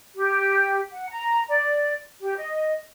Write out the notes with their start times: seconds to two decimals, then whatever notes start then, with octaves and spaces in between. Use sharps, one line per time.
0.16 G4
0.92 F#5
1.10 A#5
1.48 D5
2.20 G4
2.37 D#5